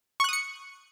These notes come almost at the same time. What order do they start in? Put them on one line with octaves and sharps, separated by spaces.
C#6 F#6 D#6 C#7